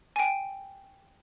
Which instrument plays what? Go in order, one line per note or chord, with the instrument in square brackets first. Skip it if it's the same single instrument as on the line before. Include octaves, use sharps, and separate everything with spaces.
[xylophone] G5 G#5